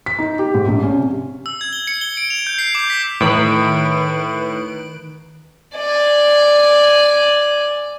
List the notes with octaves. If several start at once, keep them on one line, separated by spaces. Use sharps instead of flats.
B6
D#4
G4
G#2
A#1
C#4
C3
E6
G#6
G7
C#7
G7
D7
F7
G6
C7
D6
B6
A2 D#3 B4 D7
D5 G#5